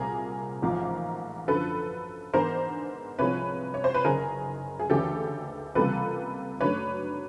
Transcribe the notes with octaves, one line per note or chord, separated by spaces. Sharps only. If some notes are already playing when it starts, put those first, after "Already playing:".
Already playing: C2 A#2 G3 C4 G#4 A#4
A1 G#2 F3 A#3
F#2 D3 F3 A4 B4
G#2 E3 G#3 B3 D4 A#4 C5
C2 C3 F3 G#3 C4 B4 C#5
C#5
C5
B4
F#1 F#2 D#3 G#4 A#4
G#4
D2 C#3 E3 G#3 C#4 G4 A4
C#2 C3 E3 G3 A#3 A4 B4
F#2 D#3 F#3 A3 D4 B4 C#5